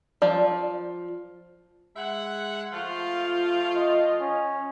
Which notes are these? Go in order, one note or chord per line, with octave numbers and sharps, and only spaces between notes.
F3 D5
G#3 E5 F#5
F3 A3 F4
D#5
C#4